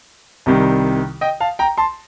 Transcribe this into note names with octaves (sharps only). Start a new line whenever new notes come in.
C2 C3 D#3 G3
D#5 G5
F5 A5
G5 A#5
A5 C6